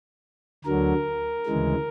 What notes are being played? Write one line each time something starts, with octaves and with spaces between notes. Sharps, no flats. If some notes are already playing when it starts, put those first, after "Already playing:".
D2 D3 F#3 A#4
D2 C#3 E3 G#3